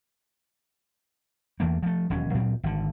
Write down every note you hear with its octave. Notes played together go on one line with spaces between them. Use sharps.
E2 E3 A3 A#3
F3 A3
E1 D#2 F#3 C#4
D2 A#2 F#3 C4
G#1 D3